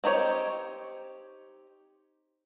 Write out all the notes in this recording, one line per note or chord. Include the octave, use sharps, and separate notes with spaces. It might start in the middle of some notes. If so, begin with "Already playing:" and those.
C4 D#4 G4 C#5